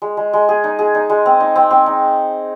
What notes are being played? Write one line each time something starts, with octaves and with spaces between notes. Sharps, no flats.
G#3
G#3
G#3
G#4
D#4
G#4
D#4
G#3
C4
D#4
C4
C4
D#4